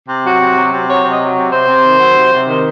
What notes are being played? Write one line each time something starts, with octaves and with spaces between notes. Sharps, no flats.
C3
F#3 F#4
C3
F#3
C3
F#3 C#5
C3
D#5
F#3
C#5
C3
C3 C5
C3
D#3
F#3
C3
C3
D#3